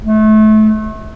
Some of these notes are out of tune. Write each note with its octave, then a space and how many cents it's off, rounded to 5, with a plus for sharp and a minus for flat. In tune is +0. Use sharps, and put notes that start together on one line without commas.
A3 -30